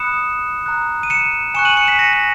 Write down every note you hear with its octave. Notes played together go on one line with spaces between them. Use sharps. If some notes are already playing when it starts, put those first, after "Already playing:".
Already playing: B5 D#6 F#6 C#7 E7
A#5 D#6 F#6
D#7
C#7 E7
G#5 C#6 F#6 C#7 E7
D#7 F#7
C#7 E7
B6 D#7
A#6 C#7
A#6